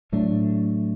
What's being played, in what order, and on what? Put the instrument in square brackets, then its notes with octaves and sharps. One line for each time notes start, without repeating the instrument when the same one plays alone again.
[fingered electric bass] A2 F#3 A3 D4